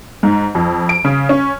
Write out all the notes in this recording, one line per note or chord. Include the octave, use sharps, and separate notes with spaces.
G#2
F2
D7
C#3
C#4